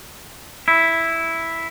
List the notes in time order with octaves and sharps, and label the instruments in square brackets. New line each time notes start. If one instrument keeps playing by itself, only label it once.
[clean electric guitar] E4